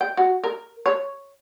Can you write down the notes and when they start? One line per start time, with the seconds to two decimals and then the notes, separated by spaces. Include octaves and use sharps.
0.01 G5
0.17 F#4
0.44 A#4
0.86 C#5